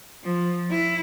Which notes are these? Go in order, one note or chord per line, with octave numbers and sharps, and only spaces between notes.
F3
E4